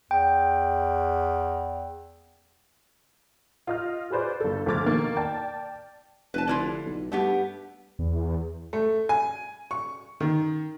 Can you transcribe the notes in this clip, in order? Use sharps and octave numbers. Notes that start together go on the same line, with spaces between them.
E2 G5
F4 D#5 F6
F#4 G#4 B4 C5 D5
G1 A4
D2 F3 A3 D6 F6 A6
B2 D#3 A#3
D5 G5 A5 A6
F1 B4 A5
D3 E4 F4
B1
G2 A3 B3 G4
E2
A3
G#5
C#6
D#3